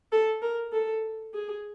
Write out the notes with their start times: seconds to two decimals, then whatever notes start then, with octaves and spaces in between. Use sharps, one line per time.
0.12 A4
0.42 A#4
0.72 A4
1.33 G#4